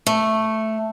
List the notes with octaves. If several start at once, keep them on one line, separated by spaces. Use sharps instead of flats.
A3